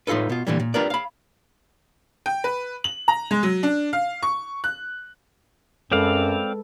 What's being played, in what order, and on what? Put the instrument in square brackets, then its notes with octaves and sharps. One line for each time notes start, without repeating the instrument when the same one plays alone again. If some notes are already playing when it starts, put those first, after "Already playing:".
[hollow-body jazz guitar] A2 D#4 F4 A4 B4
B2 F4
A#2 D3 E3 G3
A#2
D4 F4 G4 A#4 B4 D5
F5 B5
[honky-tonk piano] G5
B4
F#7
A#5
G#3
F#3
D4
F5
C#6
F#6
[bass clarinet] F#2 [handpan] G#3 A4 B4 [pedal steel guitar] C4 D5 F5